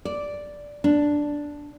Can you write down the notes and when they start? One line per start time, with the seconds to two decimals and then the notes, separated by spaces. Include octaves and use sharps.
0.05 D5
0.84 D4